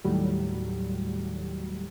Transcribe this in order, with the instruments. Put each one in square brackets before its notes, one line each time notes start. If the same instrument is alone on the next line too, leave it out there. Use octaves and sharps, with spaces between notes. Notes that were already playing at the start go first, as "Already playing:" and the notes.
[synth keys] D#2 A2 F#3 G3